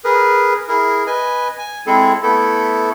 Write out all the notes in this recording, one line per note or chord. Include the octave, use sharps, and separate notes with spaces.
G#4 A#4 B4
E4 G#4 A#4
B4 D#5 G#5
G#5
G#3 C4 E4 G#4 A4
A3 B3 E4 A4